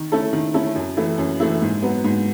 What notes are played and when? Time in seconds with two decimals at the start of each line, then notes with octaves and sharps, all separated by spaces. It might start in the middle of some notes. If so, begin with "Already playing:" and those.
Already playing: D#3
0.12 A3 C#4 E4 A4
0.33 D#3
0.54 A3 C#4 E4 A4
0.76 F#2
0.97 E3 A3 E4
1.18 F#2
1.40 E3 A3 E4
1.62 G#2
1.83 F#3 B3
2.04 G#2